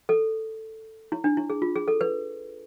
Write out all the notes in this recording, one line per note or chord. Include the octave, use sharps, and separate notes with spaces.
A4
E4
D4
E4
G#4
F4
G#4
A4
B4